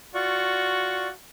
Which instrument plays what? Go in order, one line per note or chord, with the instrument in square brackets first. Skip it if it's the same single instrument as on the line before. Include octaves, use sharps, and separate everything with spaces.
[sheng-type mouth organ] F4 D5 C#6 [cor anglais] F#4